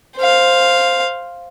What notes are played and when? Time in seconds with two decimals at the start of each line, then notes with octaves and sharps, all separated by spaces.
0.16 C5 F5